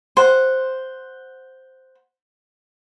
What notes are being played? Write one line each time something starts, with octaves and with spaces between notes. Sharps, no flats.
C5 F#5